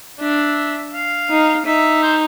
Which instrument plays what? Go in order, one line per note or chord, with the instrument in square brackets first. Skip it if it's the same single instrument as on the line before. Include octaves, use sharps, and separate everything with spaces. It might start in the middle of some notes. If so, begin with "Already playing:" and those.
[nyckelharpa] D4 [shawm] E5
[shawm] F5
[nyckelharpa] D#4
[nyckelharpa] D#4 [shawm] E5
[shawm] C5